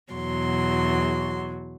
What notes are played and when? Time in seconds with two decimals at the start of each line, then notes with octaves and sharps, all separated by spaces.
0.13 E2 B2 F#3 C6